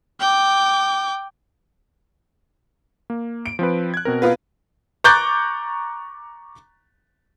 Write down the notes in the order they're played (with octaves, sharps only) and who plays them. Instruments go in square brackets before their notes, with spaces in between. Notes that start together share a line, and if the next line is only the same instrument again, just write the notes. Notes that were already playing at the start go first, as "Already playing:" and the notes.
[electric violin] G5 D6
[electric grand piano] A#3
[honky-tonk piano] D7
[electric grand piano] F3 C4 B4
F#6 G#6
B2 C4 A#4
[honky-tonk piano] B3 F4 B4
[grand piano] A#5 C#6 D6 F#6 G6 A6